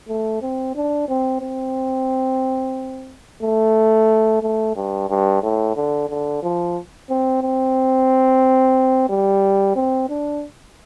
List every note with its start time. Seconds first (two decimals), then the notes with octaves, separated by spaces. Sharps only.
0.08 A3
0.42 C4
0.75 D4
1.09 C4
1.42 C4
3.42 A3
4.42 A3
4.76 G2
5.09 G2
5.43 A2
5.76 D3
6.09 D3
6.43 F3
7.10 C4
7.42 C4
9.09 G3
9.76 C4
10.09 D4